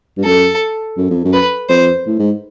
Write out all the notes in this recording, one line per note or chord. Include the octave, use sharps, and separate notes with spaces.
G2
F#2 A4
F#2
F2
F#2
B4
F2 C5
A2
G#2